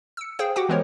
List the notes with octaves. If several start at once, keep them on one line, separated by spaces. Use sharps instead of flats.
E6 C#7
G#4 C5 F5 G5
F#4 G4 F#5 G5 D6
E3 G#3 B3 A#4 C5 C#5